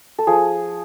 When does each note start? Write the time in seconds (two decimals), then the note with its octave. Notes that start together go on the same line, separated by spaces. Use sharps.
0.18 A4
0.27 F3 G#4